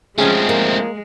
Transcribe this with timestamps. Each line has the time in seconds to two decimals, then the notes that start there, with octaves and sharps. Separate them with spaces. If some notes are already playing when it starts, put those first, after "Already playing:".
0.18 F3 G#3 A3 C4 C#4 G#4
0.49 A#3